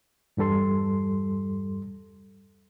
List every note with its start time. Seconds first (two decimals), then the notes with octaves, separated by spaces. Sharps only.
0.37 E2 G2 G3 A4 C6